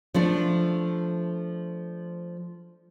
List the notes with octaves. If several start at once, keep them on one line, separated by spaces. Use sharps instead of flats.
F3 A3 D4